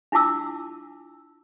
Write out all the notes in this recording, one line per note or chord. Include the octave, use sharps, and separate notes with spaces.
D4 E4 F4 A5 D6 E6